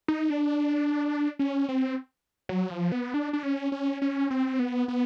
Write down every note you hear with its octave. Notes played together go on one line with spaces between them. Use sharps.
D#4
D4
C#4
C4
F#3
F3
B3
D4
D4
C#4
C#4
C#4
C4
B3
B3